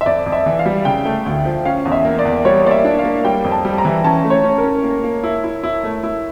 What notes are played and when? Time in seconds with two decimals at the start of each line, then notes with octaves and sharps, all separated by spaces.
0.01 E5
0.06 F2 D5
0.26 F2
0.32 E5
0.46 E3
0.59 F5
0.66 G3
0.85 C#3 G5
1.05 A3
1.26 D2
1.45 F3
1.65 C#4 F5
1.85 E2
1.92 E5
2.05 A#3
2.19 D5
2.25 E2
2.45 G3 C#5
2.65 A#3 D5
2.71 E5
2.84 D4
2.99 F5
3.05 A#3
3.24 G3 G5
3.44 F2
3.52 A5
3.65 G3
3.78 A#5
3.85 E3
4.04 C#4 A5
4.24 A3
4.30 C#5
4.44 C#4
4.58 A#4
4.64 C#4
4.84 A#3
5.04 A#3
5.23 E4
5.44 E4
5.63 E4
5.84 A3
6.03 E4